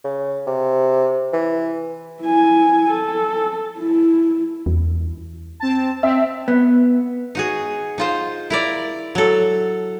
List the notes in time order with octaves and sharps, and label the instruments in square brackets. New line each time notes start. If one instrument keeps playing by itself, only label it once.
[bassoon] C#3
C3
E3
[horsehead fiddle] E4 G#5
A4
E4
[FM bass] E2
[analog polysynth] C4 A5
[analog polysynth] C4 [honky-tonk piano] E5
[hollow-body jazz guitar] B3
[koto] D#4 F#4 G#4
D#4 F4 C5
E4 A#4 D5
F#3 A4